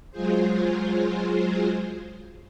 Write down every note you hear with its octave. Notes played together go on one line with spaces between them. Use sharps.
F#3 G#3 F4 G#4 C5